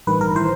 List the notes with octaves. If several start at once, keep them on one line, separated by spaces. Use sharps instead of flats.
A1 G2 D#3 B4
A#4
E3 C5